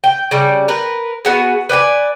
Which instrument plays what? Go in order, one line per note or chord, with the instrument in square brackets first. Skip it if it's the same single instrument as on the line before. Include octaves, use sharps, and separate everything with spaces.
[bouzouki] G5
C#3 G3
A#4 B4
B3 F#4 G#4
B4 D5 G5 G#5